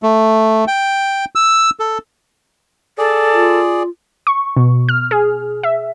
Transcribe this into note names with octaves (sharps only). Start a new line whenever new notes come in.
A3
G5
E6
A4
G#4 A4 D5
F4
C#6
B2
F6
G#4
E5